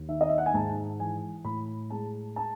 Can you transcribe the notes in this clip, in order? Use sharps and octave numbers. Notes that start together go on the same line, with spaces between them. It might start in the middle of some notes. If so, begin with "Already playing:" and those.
Already playing: D#2
D#3 E5
D#5
E5
F#5
G#5
G#2 A5
E3 G#5
A2 B5
G#3 A5
A5